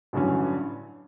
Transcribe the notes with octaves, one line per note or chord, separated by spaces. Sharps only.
A1 G2 D3 F#3 C#4